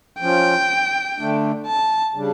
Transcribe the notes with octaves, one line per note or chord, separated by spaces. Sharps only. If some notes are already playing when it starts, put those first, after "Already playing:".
F3 C#4 F4 G5
D3 A3 D4
A5
C#3 G3 D4